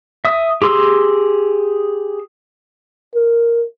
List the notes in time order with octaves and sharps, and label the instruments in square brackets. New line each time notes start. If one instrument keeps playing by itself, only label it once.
[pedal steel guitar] E5 D#6
G4 G#4 C6 E6
[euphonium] A#4